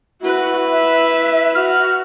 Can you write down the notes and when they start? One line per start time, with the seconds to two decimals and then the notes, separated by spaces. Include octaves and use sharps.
0.21 E4 F#4 B4
0.71 E5
1.55 F#4 F6